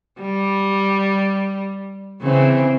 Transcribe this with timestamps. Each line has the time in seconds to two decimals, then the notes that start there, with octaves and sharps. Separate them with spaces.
0.21 G3
2.22 C#3 E3 C4